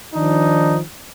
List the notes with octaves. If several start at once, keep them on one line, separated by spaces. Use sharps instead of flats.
D#3 F3 D4 D#4